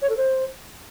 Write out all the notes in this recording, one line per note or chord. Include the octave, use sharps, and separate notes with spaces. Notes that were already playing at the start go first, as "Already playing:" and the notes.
C#5
A4
C5